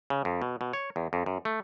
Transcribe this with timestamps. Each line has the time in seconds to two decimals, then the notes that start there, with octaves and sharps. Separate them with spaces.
0.10 C#3
0.25 F2
0.42 B2
0.61 B2
0.73 C#5
0.96 E2
1.13 F2
1.26 F#2
1.45 A3